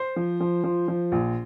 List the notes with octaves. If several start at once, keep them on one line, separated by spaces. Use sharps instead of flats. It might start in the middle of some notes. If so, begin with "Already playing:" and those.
Already playing: C5 C6
F3
F3
F3
F3
A#1